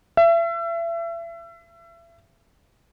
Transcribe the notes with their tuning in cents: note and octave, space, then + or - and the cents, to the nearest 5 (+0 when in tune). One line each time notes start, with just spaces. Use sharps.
E5 +35